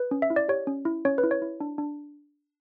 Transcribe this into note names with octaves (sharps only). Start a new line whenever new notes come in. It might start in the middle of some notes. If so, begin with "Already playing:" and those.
Already playing: B4
C#4
E5
E4
D5
G4 C#5
C#4
E4
C#4 C#5
B4
E4
C#5
E4
D4
D4